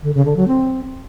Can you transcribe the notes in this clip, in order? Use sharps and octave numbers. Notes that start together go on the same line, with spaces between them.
D3
C#3
D3
F#3
C4